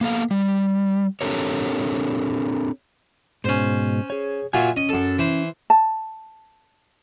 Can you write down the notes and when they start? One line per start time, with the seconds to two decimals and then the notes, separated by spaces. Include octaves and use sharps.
0.01 A#3 B3 A4 F5
0.31 G3
1.21 C4 D4 G4 A4 A#4 C#5
3.44 G#2 B2 C#4 C5
4.10 G#4 C#5
4.53 A#2 F#3 F4 E5 G#5
4.77 C#4 D#5
4.89 F#2 A4
5.19 E3 C5
5.70 A5